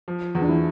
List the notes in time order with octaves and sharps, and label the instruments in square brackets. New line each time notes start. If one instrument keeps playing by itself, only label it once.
[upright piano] F3
E2
[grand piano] D4
E3 E4